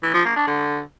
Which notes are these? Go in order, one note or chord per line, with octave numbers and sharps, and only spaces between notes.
E3
F3
A#3
D4
D3